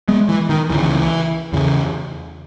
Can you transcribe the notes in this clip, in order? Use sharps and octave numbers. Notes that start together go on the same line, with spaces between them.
G#3 B3
E3
D#3
C#2 C#3 E3
E2 C#3